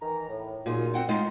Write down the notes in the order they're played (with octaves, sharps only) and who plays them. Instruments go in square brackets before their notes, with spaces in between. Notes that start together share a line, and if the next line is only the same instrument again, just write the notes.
[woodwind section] D#3 E3 A#5
A2
[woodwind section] F#2 D#4 F4 [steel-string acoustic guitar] A#2 G#4
[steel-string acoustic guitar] C4 F#5 G5
[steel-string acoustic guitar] G#3 D#4 F4 [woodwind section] C6